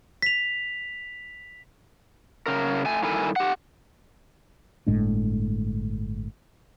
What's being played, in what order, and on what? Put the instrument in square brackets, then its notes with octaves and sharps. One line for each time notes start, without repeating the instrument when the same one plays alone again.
[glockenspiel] B6 F7
[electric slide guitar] C#3 A#4
A3 G#5
G2 D#3 E4 A4 A#4 G#5
G4 F#5
[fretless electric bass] G1 A2 G#3 D4